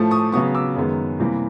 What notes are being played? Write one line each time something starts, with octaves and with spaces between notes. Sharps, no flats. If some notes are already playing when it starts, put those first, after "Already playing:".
Already playing: A2 F3 A3
C#6 D#6
C#3 F#3 B3 C#6 D#6
D6 E6
F#2 D#3 G#3 B3
C3 E3 G3 A#3